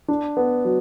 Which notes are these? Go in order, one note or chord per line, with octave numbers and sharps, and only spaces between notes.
D4
B3
F#3